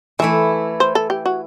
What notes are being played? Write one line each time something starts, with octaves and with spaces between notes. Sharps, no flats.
E3 A3 E4 E5
C5
A4
G4
F#4